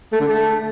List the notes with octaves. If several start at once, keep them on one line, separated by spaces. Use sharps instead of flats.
A3
D3
A3